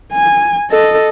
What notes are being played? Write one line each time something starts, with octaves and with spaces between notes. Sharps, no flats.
G#5
A4 D#5